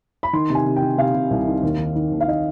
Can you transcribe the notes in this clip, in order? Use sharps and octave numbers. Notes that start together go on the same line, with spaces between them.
B5
D#3 C6
C3
G#5
C3
G5
D#3
C3 F5
C3
C2
D#3
D#2
D#3
D#3
D#2
F5
D#3 D#5